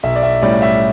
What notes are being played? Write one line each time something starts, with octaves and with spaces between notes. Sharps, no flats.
B1 E5
D5
E5
A2 G3 C#4 D5
E5